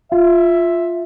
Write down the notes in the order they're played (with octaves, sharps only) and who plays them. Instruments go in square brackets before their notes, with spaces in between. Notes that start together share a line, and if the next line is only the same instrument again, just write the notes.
[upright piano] F4 [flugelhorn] E5